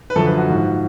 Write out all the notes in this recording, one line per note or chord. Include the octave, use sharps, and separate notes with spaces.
B4
F#2 D3 F3 A4
B4
F#4
G#2 F3